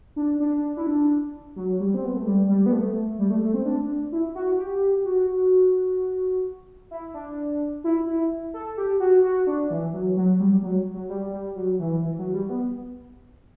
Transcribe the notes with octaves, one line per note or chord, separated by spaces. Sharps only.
D4
D4
E4
D4
F#3
G3
C4
B3
A3
G3
G3
B3
A3
G3
A3
A3
C4
D4
E4
F#4
G4
F#4
E4
D4
E4
E4
A4
G4
F#4
F#4
D4
E3
F#3
F#3
G3
F#3
F#3
G3
G3
F#3
E3
E3
F#3
G3
B3